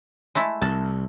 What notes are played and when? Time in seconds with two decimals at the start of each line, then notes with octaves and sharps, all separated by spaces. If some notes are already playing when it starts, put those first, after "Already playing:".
0.35 G#3 A3 E4
0.62 C2 A5